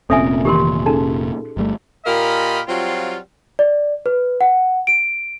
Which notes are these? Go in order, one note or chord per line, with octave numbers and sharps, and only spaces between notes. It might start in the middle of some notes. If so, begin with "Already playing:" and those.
F1 A#2 C4 C#4 A4 E5 G#5
D#3 E3 G4 A#4 C6
C#4 D#4 G#4 A4
G1 G3 A3
A#2 F4 G4 A#4 D#5 B5
F#3 G3 C4 F4
D5
B4
F#5
D7